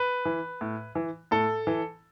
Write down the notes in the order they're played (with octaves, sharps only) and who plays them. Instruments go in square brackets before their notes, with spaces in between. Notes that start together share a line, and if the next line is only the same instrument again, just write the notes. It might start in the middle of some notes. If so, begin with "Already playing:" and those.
Already playing: [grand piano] B4
E3
A2
E3
A2 A4
E3